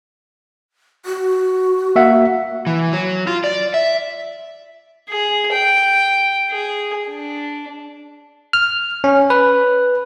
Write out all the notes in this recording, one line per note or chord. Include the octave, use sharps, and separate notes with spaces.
F#4
A#3 E5 F#5
E3
F#3
F4
D5
E5
G#4
G5
G#4
D4
F6
C#4
B4